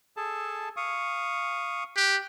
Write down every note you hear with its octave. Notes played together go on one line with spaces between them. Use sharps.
G#4 A4 A5
F5 C#6 D#6
G4 F#6